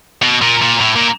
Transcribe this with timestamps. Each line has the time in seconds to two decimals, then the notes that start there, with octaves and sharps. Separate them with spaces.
0.22 B2
0.42 A#2
0.62 A#2
0.81 A2
0.96 A#2